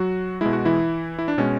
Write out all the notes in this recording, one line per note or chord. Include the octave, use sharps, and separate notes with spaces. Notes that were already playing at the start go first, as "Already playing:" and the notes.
Already playing: F#3 F#4
B2 G#3 E4
F#4
E3 E4
E4
D4
B2 G#3 C#4